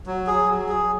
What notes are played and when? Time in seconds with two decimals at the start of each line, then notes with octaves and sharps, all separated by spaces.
0.07 F#3
0.27 G#4
0.48 F#3
0.68 G#4